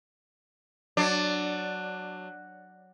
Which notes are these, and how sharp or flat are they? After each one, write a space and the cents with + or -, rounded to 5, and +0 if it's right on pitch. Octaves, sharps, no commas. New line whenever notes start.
F#3 +0 D4 +15 D5 +0